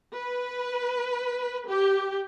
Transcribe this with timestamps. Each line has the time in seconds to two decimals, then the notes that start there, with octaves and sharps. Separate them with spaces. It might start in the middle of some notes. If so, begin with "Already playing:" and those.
0.14 B4
1.68 G4